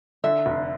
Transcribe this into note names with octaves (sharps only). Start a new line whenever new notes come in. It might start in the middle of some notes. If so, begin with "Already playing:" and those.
D3 E5
F1